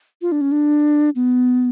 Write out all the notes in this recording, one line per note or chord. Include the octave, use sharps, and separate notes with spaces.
F4
D4
C#4
D4
B3